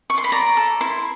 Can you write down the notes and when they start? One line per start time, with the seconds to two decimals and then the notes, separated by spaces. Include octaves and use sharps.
0.10 C#6
0.18 C6
0.24 B5
0.32 D5 A#5
0.57 A4
0.81 E4 C6